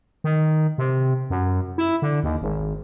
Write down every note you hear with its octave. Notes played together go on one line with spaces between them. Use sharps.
D#3
C3
F#2
E4
D3
D#2
G#1